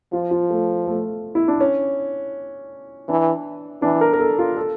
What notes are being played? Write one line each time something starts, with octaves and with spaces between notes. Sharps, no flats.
F3 F4
F4
A3
A3
E4
D4
C#4
E3 D4
E3 D4
A#4
A#4
A4
F4
A4